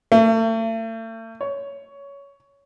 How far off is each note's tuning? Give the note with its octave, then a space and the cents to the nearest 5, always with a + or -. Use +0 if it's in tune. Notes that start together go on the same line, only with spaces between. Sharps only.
A3 +40
C#5 +15